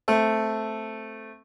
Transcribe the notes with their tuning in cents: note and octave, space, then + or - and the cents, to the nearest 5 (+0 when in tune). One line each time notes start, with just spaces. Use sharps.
A3 +0 C4 +0